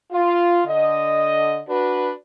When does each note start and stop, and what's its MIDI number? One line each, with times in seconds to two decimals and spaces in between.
0.12 0.62 65
0.67 1.60 50
0.67 1.60 75
1.69 2.12 62
1.69 2.12 66
1.69 2.12 71